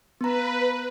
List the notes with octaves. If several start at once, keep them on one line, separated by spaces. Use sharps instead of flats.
B3 B4 A#5